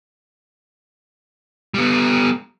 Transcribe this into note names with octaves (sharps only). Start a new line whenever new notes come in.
G3 B3